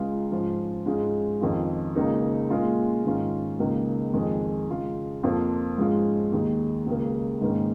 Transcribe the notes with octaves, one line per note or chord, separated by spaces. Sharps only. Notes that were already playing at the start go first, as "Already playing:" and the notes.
Already playing: C#2 C#3 G#3 F4
G#2 F3 C#4 F4
G#2 G#3 C#4 F4
F2 D#3 C#4 F4
C#2 C#3 A#3 D#4
A#2 G#3 C#4 F4
G#2 D#3 C#4 F4
C#2 C#3 A#3 D#4
F2 D#3 G#3
C#3 G#3 F4
F2 F3 A#3 F4
G#2 F3 G#3 C#4 F4
D#2 D#3 G#3
C#2 C#3 A#3
G#2 D#3 A#3 C#4